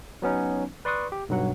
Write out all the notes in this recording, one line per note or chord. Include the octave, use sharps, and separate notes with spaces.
F#3 B3 C#4 D#4
B4 D5 C6 C#6 D#6 F#6
G4
B1 G2 F#3 F#5